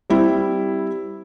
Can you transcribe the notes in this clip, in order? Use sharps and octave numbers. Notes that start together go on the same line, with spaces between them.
G3 C4 E4